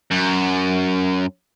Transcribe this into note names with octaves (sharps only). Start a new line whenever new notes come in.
F#2